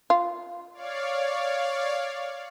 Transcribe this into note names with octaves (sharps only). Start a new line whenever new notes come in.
F4
C#5 D5 F5